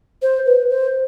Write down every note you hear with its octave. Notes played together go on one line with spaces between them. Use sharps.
C5
B4
C5